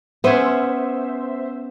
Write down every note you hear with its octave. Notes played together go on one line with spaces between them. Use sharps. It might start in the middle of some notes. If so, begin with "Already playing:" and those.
B3 C#4 C5 E5